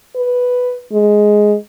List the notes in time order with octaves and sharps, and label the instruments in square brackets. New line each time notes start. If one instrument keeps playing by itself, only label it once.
[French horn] B4
G#3